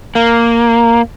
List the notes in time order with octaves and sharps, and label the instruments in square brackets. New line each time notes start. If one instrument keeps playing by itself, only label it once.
[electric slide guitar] A#3